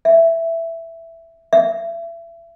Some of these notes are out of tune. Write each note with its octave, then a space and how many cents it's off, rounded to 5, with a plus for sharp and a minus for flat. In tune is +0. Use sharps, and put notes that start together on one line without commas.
E5 +5
E5 +30